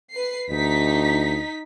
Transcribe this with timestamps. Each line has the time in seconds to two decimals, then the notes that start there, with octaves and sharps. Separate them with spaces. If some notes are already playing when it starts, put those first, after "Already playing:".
0.14 B4 C7
0.49 D2 D#4 B6